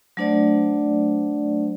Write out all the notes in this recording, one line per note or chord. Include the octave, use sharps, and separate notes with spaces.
F#3 A3 D4 C5 D5